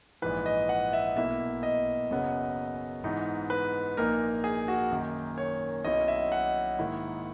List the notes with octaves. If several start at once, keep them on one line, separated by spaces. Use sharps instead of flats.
A#1 G#2 E3 B4
D#5
F#5
E5
B1 B2 A#3 E4 E5
D#5
F#1 F#2 C#3 F#3 B3
G#2 E3 B3 D#4
B4
A#1 A#2 A#3 D#4 A#4
G#4
F#4
F#2 D#3 A#3 D#4
C#5
B1 B2 F#3 C#4 E4 D#5
E5
F#5
G#2 D#3 A#3 E4